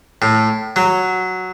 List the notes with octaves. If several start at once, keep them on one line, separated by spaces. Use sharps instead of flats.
A2
F#3